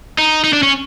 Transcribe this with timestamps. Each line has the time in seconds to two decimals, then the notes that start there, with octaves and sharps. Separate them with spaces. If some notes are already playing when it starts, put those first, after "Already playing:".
0.19 D#4
0.44 D#4
0.53 D4
0.63 C#4